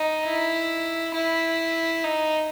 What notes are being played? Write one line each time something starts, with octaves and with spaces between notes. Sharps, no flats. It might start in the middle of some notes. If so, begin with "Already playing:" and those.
Already playing: D#4
E4
E4
D#4